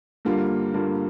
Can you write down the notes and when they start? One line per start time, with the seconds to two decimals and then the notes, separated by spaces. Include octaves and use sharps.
0.25 G2 D3 G3 A#3 F4
0.74 G2 D3 G3 A#3 F4